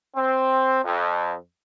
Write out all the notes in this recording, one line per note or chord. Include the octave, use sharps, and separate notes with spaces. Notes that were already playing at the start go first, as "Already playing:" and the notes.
C4
F2